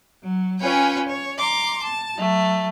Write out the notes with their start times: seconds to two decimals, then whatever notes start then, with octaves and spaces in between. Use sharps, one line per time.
0.22 F#3
0.60 C#4 F4 B4 C#5 G5 G#5
1.07 C#5
1.37 A#5 C6 D6
1.82 A5
2.16 F#3 A3